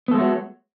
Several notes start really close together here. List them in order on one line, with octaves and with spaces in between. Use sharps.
B3 A4 G#3 A3 F#3